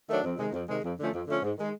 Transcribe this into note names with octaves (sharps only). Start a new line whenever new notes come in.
D#3 F#3 A3 D4
F2
C3 D#3 G#3
F2
C3 D#3 G#3
F2
D3 F3 A3 C#4
F2
D3 F3 A3 C#4
G#2
D#3 G#3